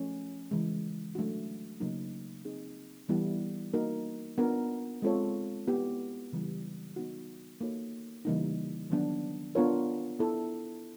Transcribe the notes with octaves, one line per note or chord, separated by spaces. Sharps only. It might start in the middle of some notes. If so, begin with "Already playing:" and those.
Already playing: F3 A3 C#4
C#3 E3 G#3
F#3 A3 D4 F#4
C#3 F#3 A#3 D#4
C4 D#4 G#4
E3 G3 B3 E4
A#3 D#4 F#4 A#4
B3 D4 F4 A#4
G#3 C4 F4 A4 C#5
B3 E4 G4 B4
C#3 E3 G3
B3 D#4 F#4
A#3 D#4 F#4 A4 C#5
C#3 E3 G3 A#3 D#4
D#3 F#3 B3 D4
B3 D4 F4 A#4 C#5
B3 E4 A4